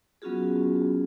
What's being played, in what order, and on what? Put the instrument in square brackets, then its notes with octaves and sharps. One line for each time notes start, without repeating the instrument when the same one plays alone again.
[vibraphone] F#3 B3 C#4 F4 F#4 G#4